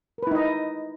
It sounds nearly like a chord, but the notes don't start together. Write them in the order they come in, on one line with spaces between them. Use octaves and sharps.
A#4 B4 E4 D#4 D#5